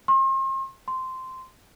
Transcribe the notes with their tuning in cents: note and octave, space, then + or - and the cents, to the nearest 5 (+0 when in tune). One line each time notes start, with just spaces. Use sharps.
C6 +40
C6 -10